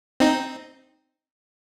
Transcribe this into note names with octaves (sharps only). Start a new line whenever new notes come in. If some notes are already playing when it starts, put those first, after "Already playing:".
C4 D#4